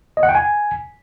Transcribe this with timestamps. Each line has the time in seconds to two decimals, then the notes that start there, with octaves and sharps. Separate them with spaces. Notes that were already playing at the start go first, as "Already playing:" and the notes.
0.17 D#5
0.23 F#5
0.29 G5
0.35 G#5